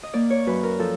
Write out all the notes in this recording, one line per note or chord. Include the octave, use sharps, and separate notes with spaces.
D#5
A#3 D5
C#5
F#2 B4
A#4
F3 A4